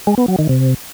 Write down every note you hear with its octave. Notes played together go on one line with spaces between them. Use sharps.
G#3
B3
F#3
D#3
C3